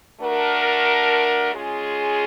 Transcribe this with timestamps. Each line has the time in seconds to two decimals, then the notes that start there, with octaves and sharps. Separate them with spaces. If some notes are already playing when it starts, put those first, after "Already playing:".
0.20 A3 D4 F#4 A#4
1.54 G#3 C#4 F4 G#4